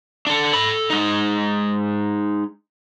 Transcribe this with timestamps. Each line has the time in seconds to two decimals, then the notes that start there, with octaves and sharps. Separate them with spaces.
0.27 D4 A4
0.53 A4 B5
0.90 G#3 D#4